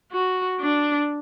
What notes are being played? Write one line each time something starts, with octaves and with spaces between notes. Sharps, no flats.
F#4
D4